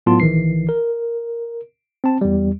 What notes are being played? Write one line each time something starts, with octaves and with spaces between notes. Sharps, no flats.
A2 F#3 B3 F4 A5 C6
A#1 D#3 E3 C7
A#4
C4 A5
E2 G3